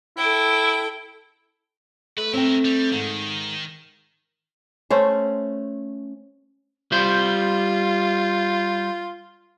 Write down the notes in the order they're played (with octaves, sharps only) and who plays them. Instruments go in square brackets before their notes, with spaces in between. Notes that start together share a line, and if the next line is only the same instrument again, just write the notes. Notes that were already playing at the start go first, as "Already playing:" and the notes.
[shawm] E4 [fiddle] A4 G5
[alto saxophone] A3 [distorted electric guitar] B4
[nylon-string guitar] C4 G5 [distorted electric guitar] E4 A#4
[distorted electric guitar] G3
[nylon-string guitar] G#2 [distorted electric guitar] D#3
[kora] A3 C#4 C5
[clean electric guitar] G3 C5 [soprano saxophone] F4